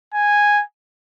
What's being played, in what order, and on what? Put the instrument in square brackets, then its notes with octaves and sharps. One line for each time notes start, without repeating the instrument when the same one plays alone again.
[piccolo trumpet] G#5